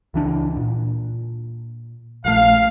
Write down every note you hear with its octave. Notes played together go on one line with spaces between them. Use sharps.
C#2 E3 D4
A#2
A#1 A3 F5